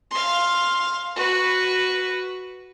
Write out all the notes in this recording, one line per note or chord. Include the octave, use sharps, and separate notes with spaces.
F5 C6
F#4 B4